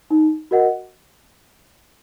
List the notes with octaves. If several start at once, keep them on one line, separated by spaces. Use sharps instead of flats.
D#4
F#4 A#4 D#5 F#5